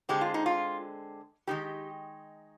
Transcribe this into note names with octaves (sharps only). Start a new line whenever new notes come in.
D3 G#3 C4 G4
F4
D#4
F4
D#3 G#3 D#4 G4